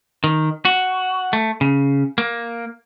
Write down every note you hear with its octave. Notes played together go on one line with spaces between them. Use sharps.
D#3
F#4
A3
C#3
A#3